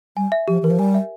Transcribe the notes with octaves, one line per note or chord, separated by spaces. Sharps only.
G3 G#5
E5
F3 G4
E3 A#4
F3
G3 G#5
E5